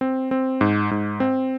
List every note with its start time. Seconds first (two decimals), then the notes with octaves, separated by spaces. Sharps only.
0.01 C4
0.31 C4
0.61 G#2
0.91 G#2
1.20 C4